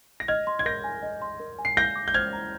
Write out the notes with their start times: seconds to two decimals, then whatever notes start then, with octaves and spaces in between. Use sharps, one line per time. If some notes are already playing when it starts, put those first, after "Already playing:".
0.20 A#6
0.28 D#5 F6 G#6
0.47 C6
0.59 G#6
0.65 A#4 G6 A#6
0.84 G#5
1.03 D#5
1.22 C6
1.40 A#4
1.59 G#5
1.65 C7
1.77 F5 G6 A#6
1.96 D6
2.08 G6
2.14 C5 F6 G#6
2.33 A#5